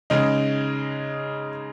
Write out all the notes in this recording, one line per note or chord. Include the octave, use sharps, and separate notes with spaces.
C#3 G#3 D#4